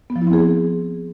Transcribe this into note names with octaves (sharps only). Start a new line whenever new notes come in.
B3
F3
E4
C4
G#4